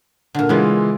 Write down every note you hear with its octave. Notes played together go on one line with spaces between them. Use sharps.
A#2 D3
C#3 E3 G#3 B3 F4